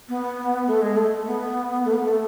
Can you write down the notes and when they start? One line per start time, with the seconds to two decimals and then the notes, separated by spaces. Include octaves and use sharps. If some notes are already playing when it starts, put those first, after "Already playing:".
0.09 B3
0.67 A3
0.82 G#3
0.96 A3
1.26 B3
1.85 A3
1.93 B3
2.03 A3